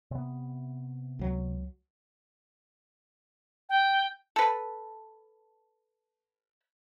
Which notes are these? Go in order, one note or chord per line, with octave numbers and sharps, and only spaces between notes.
C3 B3
C#2 F#3
G5
A4 B4